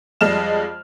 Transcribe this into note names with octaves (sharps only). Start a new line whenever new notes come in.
F2 G3 G#3 D#5 F6 E7